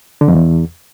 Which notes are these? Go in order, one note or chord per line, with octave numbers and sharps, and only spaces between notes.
D3
F2
E2